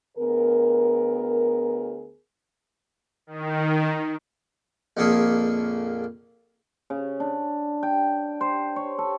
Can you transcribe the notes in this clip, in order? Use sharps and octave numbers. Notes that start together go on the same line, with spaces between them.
D2 B3 G#4 A#4
D#3
A#1 F2 A#3 G#4 A4
C#3
D4
G5
C5
C#5
A4